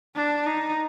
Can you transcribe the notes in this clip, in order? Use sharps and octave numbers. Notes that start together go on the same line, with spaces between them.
D4
D#4